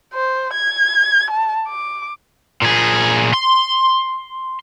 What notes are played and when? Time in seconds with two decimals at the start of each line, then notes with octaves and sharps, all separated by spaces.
0.14 C5
0.54 G#6
1.31 A5
1.68 D6
2.62 A#2 G#4
3.34 C6